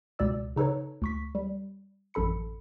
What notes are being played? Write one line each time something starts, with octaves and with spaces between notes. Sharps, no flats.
C#2 B2 D5 E6
C#3 D#4 A4 B4 C#5
D2 C#6 B6
G3
A1 F#2 A4 B5 C#7